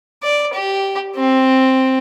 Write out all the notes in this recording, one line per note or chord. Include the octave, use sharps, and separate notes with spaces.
D5
G4
C4